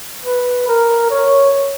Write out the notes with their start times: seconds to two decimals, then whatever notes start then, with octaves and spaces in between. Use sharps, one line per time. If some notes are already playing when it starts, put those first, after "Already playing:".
0.25 B4
0.68 A#4
1.11 C#5